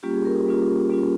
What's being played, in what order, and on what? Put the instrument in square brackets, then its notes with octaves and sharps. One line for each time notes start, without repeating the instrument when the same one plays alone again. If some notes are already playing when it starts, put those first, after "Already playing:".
[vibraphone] G3 A#3 C#4 F4 G4
G#4
A#4
G4
G3 A#3 C#4 F4
G3 A#3 C#4 F4